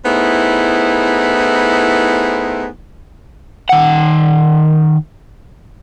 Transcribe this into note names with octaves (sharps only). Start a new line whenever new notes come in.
A2 B3 D#4 E4 G#4 C5
D#3 F#5